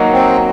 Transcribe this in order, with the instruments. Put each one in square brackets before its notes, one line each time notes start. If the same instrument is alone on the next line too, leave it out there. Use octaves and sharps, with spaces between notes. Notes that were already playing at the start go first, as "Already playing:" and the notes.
Already playing: [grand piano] F#3 A#3 D#4 F#4
[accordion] C4